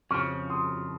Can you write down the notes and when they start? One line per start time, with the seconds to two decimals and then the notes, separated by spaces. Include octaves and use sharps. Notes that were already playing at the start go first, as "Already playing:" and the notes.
0.11 F2 C#3 F3 C#6 F6
0.50 C6 D#6